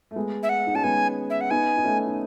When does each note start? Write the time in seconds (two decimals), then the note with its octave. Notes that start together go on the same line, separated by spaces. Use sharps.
0.11 A3
0.16 G#3 B3
0.43 E5
0.49 F#5
0.67 D#4
0.74 C#4 A5
0.84 G#3 B3 G#5
1.30 E5
1.41 F#5
1.50 B3 D#4 G#5
1.77 D#4
1.84 A3 C#4
2.06 D#4